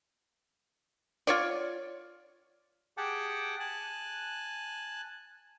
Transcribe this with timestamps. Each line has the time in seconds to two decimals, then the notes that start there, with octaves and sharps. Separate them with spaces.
1.27 F4 C#5 D5
2.97 G4 G#4 F#5 G5 A5 D6
3.60 G#5 A5 F#6